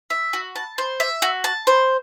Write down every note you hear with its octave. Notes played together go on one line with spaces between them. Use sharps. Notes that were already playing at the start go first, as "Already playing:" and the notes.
E5
F#4
A5
C5
E5
F#4
A5
C5